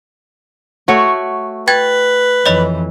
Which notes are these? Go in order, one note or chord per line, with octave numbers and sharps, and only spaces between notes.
A3 F#4 C#5
B4 G5 G#6 A6
F2 E3 C#5 D#5 B5